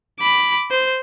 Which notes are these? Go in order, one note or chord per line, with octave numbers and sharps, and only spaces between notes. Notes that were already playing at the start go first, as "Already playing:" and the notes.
B5 D6
C5